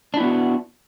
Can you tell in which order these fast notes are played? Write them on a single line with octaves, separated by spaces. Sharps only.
D4 E4 B3 F#4